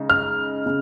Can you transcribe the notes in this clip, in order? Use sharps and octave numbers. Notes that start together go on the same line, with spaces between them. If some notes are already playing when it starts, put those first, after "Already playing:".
Already playing: C#3 G#3 D#4
F6
C#3